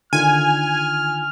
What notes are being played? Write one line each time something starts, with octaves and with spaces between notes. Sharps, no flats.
D3 D#3 F4 G#5 F6